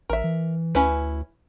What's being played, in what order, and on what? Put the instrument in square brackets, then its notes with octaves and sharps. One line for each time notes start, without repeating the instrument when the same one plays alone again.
[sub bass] A1 [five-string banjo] A#4 E5
[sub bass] E3
[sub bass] D2 [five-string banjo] C#4 E4 B4